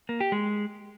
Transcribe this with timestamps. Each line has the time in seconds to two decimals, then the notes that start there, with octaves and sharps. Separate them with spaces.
0.09 A#3
0.20 G4
0.32 G#3